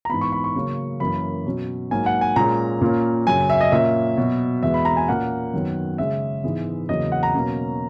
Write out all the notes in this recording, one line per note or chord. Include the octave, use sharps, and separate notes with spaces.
A#5
G#2 E3 B3 B5
C#6
B5
C#6
C#3 F#3 A#3 C#4
F#2 E3 A#3 C#4 B5
B2 F#3 C#4
G#2 F#3 A#3 G#5
F#5
G#5
A#2 G#3 C#4 A#5
A#2 A#3 C#4
F#2 C#3 F#3 G#5
E5
D#5
A#2 A#3 C#4 E5
B2 F#3 B3
E2 B2 G#3 B3 E5
B5
A#5
G#5
A#2 A#3 C#4 F#5
F#2 D#3 F#3 B3
C#3 G#3 C#4 E5
G#2 E3 G#3 B3
E2 C#3 F#3 A#3 D#5
F#5
A#5
B2 F#3 A#3 C#4